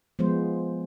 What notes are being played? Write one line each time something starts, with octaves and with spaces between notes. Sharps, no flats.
F3 G#3 B3 C5